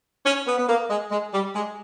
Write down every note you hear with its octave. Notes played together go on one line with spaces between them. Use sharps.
C#4
B3
B3
A#3
G#3
G#3
G3
G#3